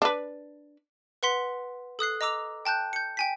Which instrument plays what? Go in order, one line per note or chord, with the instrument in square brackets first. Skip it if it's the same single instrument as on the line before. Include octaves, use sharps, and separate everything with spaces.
[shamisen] D4 B4
[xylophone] B4 F#5 C6 B6
A4 D#6 F#6 C7
D#5 A#5 D6 E6 F7
G5 A5 F#6 G6
G6 C#7
G5 G#5 B6